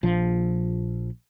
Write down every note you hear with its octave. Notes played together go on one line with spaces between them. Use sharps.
A#1 F3